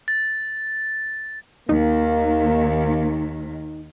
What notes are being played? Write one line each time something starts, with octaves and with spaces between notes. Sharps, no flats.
A6
D#2 D#3 A#3 D#4